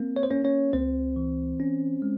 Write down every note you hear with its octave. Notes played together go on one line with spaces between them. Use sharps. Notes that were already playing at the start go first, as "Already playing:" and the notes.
Already playing: A#3 C4
C#5
C5
A#3 C#4 C#5
C#4 C#5
C#2 C4 C5
E3
C#4
G#3